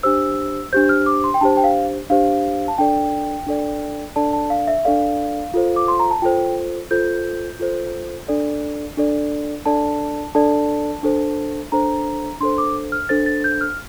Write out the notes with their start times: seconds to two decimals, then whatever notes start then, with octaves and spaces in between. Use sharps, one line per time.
0.03 D4 G4 C5 E6
0.72 D4 G4 C5 G6
0.89 F6
1.06 D6
1.24 C6
1.34 G5
1.41 D4 G4 C5 A5
1.57 G5
1.64 F5
2.10 D4 G4 C5 F5
2.68 A5
2.78 D4 A4 D5 G5
3.47 D4 A4 D5
4.16 D4 A4 D5 A5
4.33 A5
4.50 F5
4.68 E5
4.85 D4 A4 D5 F5
5.54 F4 A4 C5
5.76 D6
5.88 C6
5.99 A#5
6.11 A5
6.22 F4 A4 C5 G5
6.91 F4 A4 C5 G6
7.59 F4 A4 C5
8.28 D4 A4 D5
8.97 D4 A4 D5
9.66 D4 A4 D5 A5
10.35 D4 A4 D5 A5
11.03 D4 A4 C5
11.72 D4 A4 C5 A#5
12.41 D4 A4 C5 C6
12.58 D6
12.92 F6
13.09 D4 A4 C5 A6
13.26 A6
13.44 G6
13.61 F6